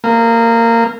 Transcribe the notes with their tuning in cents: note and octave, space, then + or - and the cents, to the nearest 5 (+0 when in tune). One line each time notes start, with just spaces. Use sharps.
A#3 -20